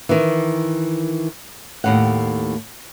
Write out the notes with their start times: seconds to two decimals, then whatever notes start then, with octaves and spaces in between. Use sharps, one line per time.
0.09 D#3 E3
1.84 D#2 A2 F#5